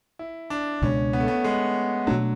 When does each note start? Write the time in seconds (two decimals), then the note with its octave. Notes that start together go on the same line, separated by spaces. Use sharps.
0.19 E4
0.50 D4
0.82 C#2 B2 G#3 C#4 D4
1.13 B3
1.20 A3
1.28 B3
1.44 G#3
2.07 B2 F#3 A3 D4